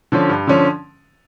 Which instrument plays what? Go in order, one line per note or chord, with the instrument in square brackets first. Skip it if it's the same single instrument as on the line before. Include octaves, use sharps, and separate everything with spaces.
[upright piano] D3 F3 C#4
G2
D3 F3 C#4